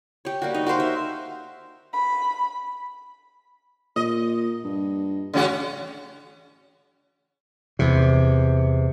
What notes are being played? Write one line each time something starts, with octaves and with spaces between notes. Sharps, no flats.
G4 C#5
G3 A#3 F#4
D#4
F#4 A#4 C5 F5
E5
B5
A#2 D#5
G2
A1 C#3 C#4 F#4
E2 C3